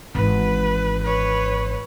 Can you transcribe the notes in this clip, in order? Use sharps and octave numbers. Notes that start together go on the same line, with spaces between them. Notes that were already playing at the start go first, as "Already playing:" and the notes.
G#1 E3 B4
B4 C#5